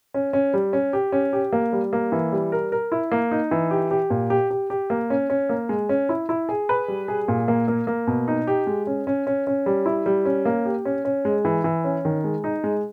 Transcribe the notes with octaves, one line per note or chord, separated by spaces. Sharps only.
C#4
C#4
G3
C#4
G4
C#4
G4
A#3
G3
A#3
E3
G3
A#4
A#4
E4
A#3
D#4
E3
G4
G4
A#2
G4
G4
G4
A#3
C#4
C#4
A#3
G#3
C#4
E4
E4
G#4
B4
G3
G#4
A#2
A#3
A#3
A#3
B2
D#4
G4
G#3
C#4
C#4
C#4
C#4
G3
E4
G3
C#4
A#3
G4
C#4
C#4
G#3
E3
E3
C#4
D#3
G#3
D#4
G#3